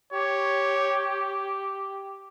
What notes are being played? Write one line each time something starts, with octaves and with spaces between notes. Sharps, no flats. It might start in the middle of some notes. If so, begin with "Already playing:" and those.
G4 C#5